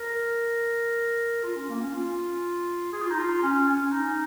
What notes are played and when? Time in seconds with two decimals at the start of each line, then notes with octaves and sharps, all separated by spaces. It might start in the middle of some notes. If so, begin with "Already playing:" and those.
Already playing: A#4
1.43 F4
1.56 C#4
1.68 A#3
1.81 C#4
1.93 F4
2.92 G#4
3.02 F4
3.10 D#4
3.19 F4
3.43 C#4
3.67 C#4
3.92 D#4